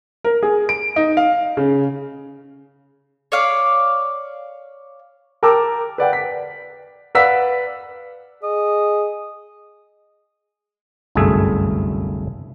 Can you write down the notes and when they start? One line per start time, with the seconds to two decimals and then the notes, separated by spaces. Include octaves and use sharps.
0.24 A#4
0.43 G#4
0.69 D7
0.96 D#4
1.17 F5
1.57 C#3
3.32 C#5 D5 F5
5.43 A#4 G5 A5 D6 E6
5.98 B4 D5 F#5 G5
6.13 B6
7.15 B4 D5 F5 F#5 E6 B6
8.43 G#4 D#5
11.15 G1 C2 F#2 A3 G#4 E5